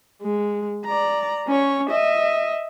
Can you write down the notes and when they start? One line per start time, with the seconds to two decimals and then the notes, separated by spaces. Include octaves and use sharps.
0.22 G#3
0.85 D5 A#5
1.47 C#4 C#5
1.89 D#5 E5